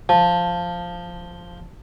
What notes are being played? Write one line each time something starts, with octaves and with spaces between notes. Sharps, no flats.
F3 A5